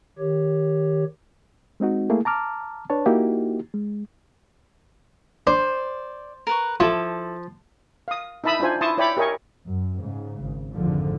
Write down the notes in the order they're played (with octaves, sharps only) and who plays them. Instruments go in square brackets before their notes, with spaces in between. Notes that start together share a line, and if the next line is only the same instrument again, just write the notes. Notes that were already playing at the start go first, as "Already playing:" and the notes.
[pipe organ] D#3 G4 C#5
[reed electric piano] G#3 C4 D#4 F#4
A3 A#3 E4 G#4
A5 A#5 D6 F6
D4 B4 C#5 A5
A#3 D#4 E4 F#4 G4
G#3
[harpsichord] D4 [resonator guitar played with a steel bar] C5 [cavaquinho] D5
[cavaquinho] A#4 B4 C#6
[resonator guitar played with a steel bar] F3 [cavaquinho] E4 A4 D6 [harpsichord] F4
[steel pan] F5 D#6
D#4 E4 E5 A5 B5 D#6
D4 D#4 F4 C5 G#5
E4 A5 C6 C#6 D#6
E4 C#5 D5 G5 B5 D6
G4 A#4 C#5 D#5 G#5 C#6
[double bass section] F#2
G#2 C#3
G#1
G#1 F2 G#2 D3 F3